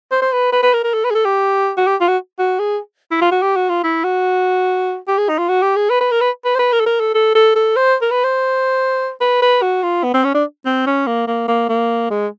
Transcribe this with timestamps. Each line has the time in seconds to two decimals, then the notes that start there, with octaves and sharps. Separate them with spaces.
0.11 C5
0.22 C5
0.32 B4
0.52 B4
0.63 B4
0.74 A#4
0.84 A#4
0.94 A4
1.04 B4
1.10 G#4
1.15 A4
1.25 G4
1.77 F#4
1.87 G4
2.00 F4
2.08 F#4
2.39 F#4
2.59 G#4
3.11 E4
3.21 F4
3.31 F#4
3.42 G4
3.56 F#4
3.69 F4
3.83 E4
4.04 F#4
5.08 G4
5.18 G#4
5.29 D#4
5.39 F4
5.49 F#4
5.62 G4
5.76 G#4
5.90 B4
6.01 B4
6.11 A#4
6.21 B4
6.45 B4
6.55 C5
6.59 B4
6.72 A#4
6.80 A4
6.86 A#4
7.00 A4
7.14 A4
7.35 A4
7.55 A4
7.76 C5
8.02 A#4
8.11 B4
8.24 C5
9.20 B4
9.42 B4
9.62 F#4
9.83 F4
10.03 B3
10.14 C4
10.24 C#4
10.35 D4
10.65 C4
10.86 C#4
11.07 A#3
11.27 A#3
11.48 A#3
11.69 A#3
12.10 G#3